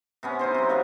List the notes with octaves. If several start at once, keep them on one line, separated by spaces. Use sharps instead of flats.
C3 B3 C#4
D#4 E4 C5 C6
C3 F#3
B3 A#4 F5